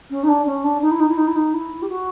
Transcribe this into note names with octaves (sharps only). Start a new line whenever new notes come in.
C#4
D#4
D4
C#4
D4
D#4
E4
D#4
E4
D#4
E4
D#4
E4
G4
F#4